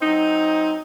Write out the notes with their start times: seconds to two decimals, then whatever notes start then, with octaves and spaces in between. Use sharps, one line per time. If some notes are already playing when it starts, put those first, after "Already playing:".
0.01 F#3 C4 D#4